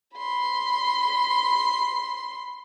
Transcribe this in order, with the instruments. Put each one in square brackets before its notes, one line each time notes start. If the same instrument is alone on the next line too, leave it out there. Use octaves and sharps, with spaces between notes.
[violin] B5 C6